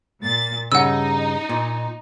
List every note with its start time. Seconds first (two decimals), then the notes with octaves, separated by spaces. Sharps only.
0.22 A#2 A6
0.72 G2 C#3 D#4 F#5 E6
1.49 A#2